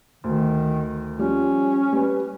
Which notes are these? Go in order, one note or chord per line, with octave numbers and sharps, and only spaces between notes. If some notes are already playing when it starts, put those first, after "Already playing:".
D2 D#3
F3 G3 C#4
G3 B4